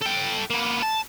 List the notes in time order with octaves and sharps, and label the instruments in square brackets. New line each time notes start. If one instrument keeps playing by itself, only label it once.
[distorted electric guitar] A4 G5
A#3 B3
A5